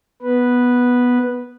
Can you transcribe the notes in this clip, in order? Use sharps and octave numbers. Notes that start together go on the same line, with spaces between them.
B3 B4